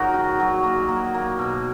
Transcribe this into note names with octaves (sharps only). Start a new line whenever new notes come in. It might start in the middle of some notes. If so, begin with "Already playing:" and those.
Already playing: A#2 F#3 A#3 D#4 F#4 G#4 A#4
D#3
F#3
A#3
A#3
A#3
B2